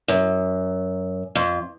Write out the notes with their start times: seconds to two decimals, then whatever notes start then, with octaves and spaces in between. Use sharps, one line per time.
0.08 F#2
1.35 F2